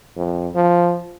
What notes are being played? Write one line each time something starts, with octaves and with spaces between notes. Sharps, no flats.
F2
F3